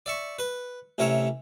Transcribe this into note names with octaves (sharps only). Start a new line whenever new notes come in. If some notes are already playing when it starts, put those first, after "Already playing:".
D5 E5 C#6
B4
A1 C3 A#4 C#5 E5